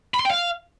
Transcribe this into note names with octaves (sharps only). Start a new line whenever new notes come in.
B5
C6
G5
F5